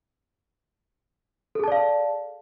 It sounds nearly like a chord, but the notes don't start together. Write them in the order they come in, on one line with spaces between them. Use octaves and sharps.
A4 G#4 A5 D5 F5